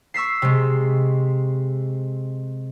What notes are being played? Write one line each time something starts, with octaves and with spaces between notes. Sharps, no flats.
C#6 E6 B6 C7
C3 G#3